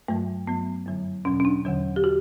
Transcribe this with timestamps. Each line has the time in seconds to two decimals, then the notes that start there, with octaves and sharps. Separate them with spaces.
0.08 G2 F#3 A3
0.47 G2 F#3 B3
0.86 F#2 D3 F#3
1.25 E2 B2 F#3 C#4
1.40 C#4
1.45 D4
1.65 E2 D3 F#3
1.96 G4
2.04 F#4